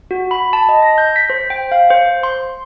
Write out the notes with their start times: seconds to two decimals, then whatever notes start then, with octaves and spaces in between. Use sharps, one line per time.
0.11 F#4
0.31 B5
0.53 A5
0.69 D#5
0.82 A#6
0.98 G6
1.16 B6
1.30 C5
1.50 G5
1.72 F5
1.91 C5
2.23 C6